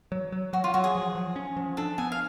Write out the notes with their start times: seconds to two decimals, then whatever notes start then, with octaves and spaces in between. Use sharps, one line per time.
0.12 F#3
0.32 F#3
0.53 F#3 F#4
0.64 F4
0.74 F#3 F#4
0.84 G#4
0.95 F3
1.15 F3
1.36 C#4
1.57 F3
1.77 D4 A4
1.98 B3 G#5
2.12 F5